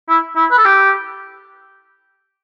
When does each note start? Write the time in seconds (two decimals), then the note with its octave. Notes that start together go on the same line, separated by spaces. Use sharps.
0.09 E4
0.36 E4
0.51 B4
0.58 A4
0.65 G4